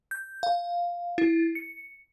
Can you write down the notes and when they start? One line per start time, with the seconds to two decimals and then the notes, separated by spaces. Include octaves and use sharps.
0.11 G6
0.43 F5
1.18 E4
1.55 C#7